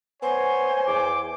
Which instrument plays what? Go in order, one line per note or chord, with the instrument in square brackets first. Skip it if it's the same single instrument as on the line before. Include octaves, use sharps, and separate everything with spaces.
[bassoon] B3 [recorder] C5 [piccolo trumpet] C#5 [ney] G#5
[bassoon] E2 [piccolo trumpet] D6